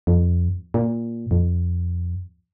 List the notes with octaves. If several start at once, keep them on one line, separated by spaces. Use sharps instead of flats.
F2
A#2
F2